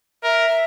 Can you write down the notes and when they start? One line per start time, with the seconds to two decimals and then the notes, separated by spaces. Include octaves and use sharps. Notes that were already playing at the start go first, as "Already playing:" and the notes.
0.23 A#4 E5